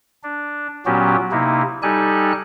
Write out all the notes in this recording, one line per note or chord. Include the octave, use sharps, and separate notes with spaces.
D4
A#2 F#3 B3 C#4 F#4 G4
C3 A#3 D#4 E4
G3 D#4 G4 A4 G#5 F#6